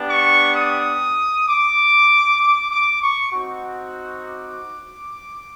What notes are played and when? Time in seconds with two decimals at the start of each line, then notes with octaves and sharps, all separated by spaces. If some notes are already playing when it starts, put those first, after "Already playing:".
Already playing: B3 D4 G4
0.10 C#6
0.56 D#6
1.48 D6
2.41 D6
2.71 D6
3.02 C#6
3.33 C4 D#4 F#4
4.25 D6